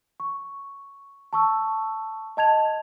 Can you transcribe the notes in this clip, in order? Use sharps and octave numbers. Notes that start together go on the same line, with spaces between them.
C#6
A5 C#6 E6
D#5 A5 G#6 F7